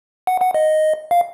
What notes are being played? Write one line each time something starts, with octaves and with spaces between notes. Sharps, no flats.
F#5
F#5
D#5
F5